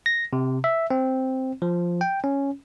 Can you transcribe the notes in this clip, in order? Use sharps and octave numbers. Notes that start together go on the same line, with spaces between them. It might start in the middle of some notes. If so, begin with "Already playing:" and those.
A#6
C3
E5
C4
F3
G5
C#4